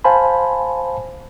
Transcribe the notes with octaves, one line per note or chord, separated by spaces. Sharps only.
C5 F5 G#5 A5 B5